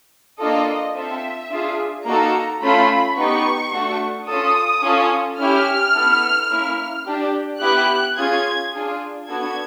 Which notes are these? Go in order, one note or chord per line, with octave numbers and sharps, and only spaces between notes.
A#3 D4 F4 A4 D#5
C4 F4 A4 E5
D4 F4 G#4
A#3 D#4 F#4 A4 A#5
A3 C#4 F4 A4 B5
B3 D#4 G4 C#6
A3 D4 F#4 A4
C#4 F4 A4 D#6
C#4 F4 A4
C#4 E4 G4 F6
B3 E4 A4
A#3 C#4 E4
D4 G4
B3 E4 G4 F#6
C#4 F4 G#4 G#6
D4 F4 G#4
B3 D4 F#4 A4 G#6